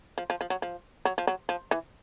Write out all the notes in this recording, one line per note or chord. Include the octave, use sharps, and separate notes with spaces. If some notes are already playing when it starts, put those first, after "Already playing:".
F3
F3
F3
F#3
F3
F#3
F3
F#3
F3
E3